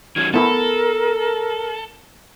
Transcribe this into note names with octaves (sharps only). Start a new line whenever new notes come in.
D#3 F#3 C#4 G#6
B3 E4 A4 A#4